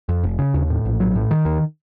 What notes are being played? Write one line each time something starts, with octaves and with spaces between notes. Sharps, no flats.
F2
F1
C#3
D#2
A2
A#1
F#3
A2
D#3
D#2